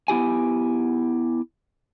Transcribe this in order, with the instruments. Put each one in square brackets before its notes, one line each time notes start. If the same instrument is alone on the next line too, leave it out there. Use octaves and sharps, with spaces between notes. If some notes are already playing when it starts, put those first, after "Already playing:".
[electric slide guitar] B3 E4 G4 G#5